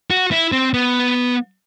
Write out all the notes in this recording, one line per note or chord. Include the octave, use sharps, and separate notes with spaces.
F#4
E4
C4
B3